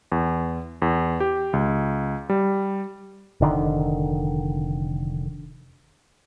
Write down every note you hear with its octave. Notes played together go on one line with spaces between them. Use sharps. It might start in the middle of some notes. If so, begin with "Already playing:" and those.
E2
E2
G4
C#2
G3
F1 D3 D#3